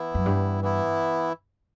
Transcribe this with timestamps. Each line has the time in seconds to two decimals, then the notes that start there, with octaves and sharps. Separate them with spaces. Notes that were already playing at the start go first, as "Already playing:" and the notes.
Already playing: E3 B3 E4
0.15 F#2
0.26 G2
0.61 E3 B3 E4